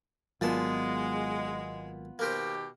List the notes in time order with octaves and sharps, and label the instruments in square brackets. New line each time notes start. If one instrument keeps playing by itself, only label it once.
[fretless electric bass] G#1 F#3 [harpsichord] A#2 D5 A5 [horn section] G#3 [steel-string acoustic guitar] B3 F4
[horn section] B2 D#3 G4 [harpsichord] A#3 A#4 C5